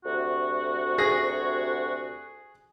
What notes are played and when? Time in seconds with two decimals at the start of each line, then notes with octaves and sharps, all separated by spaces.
0.05 D2 C3 F#4
0.98 G#4 A#6